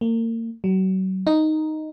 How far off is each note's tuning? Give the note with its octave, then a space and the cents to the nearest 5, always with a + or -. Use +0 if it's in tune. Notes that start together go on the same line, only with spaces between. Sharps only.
A#3 -35
F#3 +35
D#4 +0